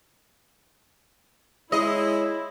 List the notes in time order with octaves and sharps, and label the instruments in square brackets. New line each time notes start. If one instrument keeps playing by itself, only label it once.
[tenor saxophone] G#3 [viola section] E4 [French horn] C#5 [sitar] D#5